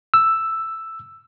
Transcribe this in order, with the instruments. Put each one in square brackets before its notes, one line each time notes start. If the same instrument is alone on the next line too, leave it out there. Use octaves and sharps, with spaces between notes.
[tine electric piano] E6